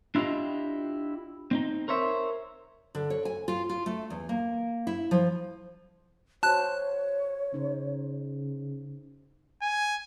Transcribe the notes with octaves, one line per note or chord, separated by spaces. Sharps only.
D4 E4 F4 G4 D#5
C4 D4 D#4
A#4 C5 C#5 E5
D3
C#5
G#5
F4
F4
A3
E2
A#3
E4
F3
F#4 C5 C#5 A5 F#6
C#3 D#4 C5
G#5